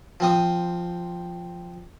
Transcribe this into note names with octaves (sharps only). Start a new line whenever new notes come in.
F3 C4 D#6